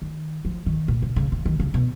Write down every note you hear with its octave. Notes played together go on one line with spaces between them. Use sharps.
D#3
F3
D#3
A#2
C#3
C#3
D#3
D#3
C#3
B2